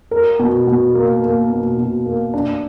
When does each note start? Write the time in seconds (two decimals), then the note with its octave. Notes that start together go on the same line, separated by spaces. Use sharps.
0.11 A#4
0.39 B2
0.67 B2
0.95 A#3
1.22 A#3
1.50 B2
1.77 B2
2.06 A#3
2.34 D4